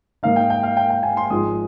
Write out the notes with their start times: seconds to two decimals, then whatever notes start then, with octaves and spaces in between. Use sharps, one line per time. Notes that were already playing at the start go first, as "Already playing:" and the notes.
0.23 G#2 D#3 A#3 D#4 F5
0.36 G5
0.50 G5
0.63 F5
0.77 G5
0.90 G5
1.03 G#5
1.17 C6
1.30 G#1 G#2 F3 G#3 D#6